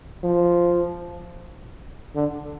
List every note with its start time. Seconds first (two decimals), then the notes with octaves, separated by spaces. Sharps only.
0.24 F3
2.15 D3